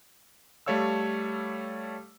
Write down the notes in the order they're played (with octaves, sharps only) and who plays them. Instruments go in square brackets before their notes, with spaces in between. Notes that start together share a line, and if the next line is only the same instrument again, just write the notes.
[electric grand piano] G3 A3 A4 C#5 F5 E6